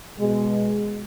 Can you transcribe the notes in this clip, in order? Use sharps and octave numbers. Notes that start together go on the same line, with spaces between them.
B2 G#3